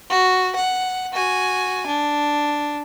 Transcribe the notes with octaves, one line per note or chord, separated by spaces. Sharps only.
F#4
F#5
F#4 G#5
D4